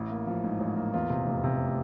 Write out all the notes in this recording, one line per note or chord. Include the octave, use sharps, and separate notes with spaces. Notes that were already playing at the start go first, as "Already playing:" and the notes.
Already playing: A1 E4
A#3
F3
G#2
A1
A#3
E2 F4
C3
F1
C3